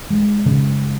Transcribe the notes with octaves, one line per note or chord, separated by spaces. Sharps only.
G#3
C#3